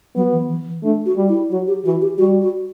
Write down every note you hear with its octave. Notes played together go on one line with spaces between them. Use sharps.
F#3 B3
E3
E3
E3
A3 D4
F#4
G3
E4
F#3 F#4
G4
E3 F#4
G4
G3 F#4
F#4